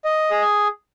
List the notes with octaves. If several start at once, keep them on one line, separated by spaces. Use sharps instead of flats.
D#5
G#4